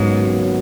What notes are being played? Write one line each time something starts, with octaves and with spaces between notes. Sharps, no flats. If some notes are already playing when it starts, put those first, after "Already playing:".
Already playing: D#2 G#2 C#3 F#3 B3